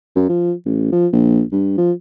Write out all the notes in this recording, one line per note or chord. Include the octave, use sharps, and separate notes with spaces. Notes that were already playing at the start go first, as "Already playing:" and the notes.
F#2
F3
A1
F3
A#1
G2
F3